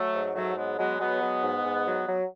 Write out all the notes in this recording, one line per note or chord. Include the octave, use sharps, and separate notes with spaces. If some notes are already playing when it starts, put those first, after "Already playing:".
Already playing: F#3 A3
G#2
G#2 F#3 A3
F#3 G#3 B3
F#3 G#3 B3
F#3 G#3 B3
F#3
G#2
G#2
F#3
F#3